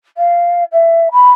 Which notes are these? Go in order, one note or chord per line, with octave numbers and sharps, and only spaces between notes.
F5
E5
B5